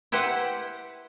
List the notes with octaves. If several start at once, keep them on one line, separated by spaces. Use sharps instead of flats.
E4 G4 B4 C5 F#5